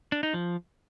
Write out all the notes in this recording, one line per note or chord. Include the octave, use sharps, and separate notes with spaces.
D4
D#4
F3